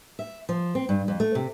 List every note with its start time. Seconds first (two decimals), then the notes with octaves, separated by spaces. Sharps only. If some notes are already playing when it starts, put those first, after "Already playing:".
0.19 E5
0.49 F3
0.75 C4
0.89 G2
1.08 F2
1.20 A3
1.35 C3